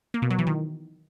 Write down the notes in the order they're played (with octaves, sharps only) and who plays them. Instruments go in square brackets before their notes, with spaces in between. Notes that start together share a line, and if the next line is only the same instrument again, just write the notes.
[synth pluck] A#3
B2
F#3
E3
D#3